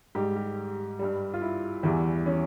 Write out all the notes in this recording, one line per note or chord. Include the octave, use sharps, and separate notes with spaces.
G#2 G3 G4
G4
G2 G3
F4
E4
E2 E3 G3
C#4